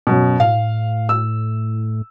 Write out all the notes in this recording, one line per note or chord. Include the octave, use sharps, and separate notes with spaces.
F#2 B2
A2 F5
E6